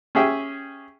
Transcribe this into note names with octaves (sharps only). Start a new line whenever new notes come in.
C#4 G4 G#4 E5 G5